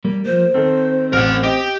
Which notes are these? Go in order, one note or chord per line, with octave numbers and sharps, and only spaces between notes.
G3 A#3
F3 A#3 C5
D#3 C4 A4
A1 A#4 F#5
G4 D#5